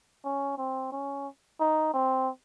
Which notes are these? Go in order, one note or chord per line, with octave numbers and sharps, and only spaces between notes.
C#4
C4
C#4
D#4
C4